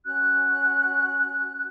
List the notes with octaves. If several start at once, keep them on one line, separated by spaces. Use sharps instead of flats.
C#4 F#4 F#6